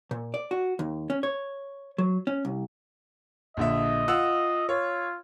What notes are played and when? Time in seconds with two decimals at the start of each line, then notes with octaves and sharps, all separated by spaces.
0.11 A#2
0.34 D5
0.51 F#4
0.79 D#2
1.10 C#4
1.23 C#5
1.98 F#3
2.27 C#4
2.45 C2
3.57 A#1 D3 D#5 E5
4.08 F4 F#5 E6
4.69 F4 C#5